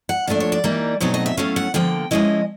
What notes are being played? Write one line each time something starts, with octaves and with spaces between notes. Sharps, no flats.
F#5
A#2 F3 A3 D4 D5
C#5
D5
E3 G3 A#3 D#4
B2 F#3 A3 C4 D#4 C#5
D#5
E5
A2 F#3 A3 C#4 F5
F#5
D3 F3 A#3 G5
F3 G#3 C#4 E4 D#5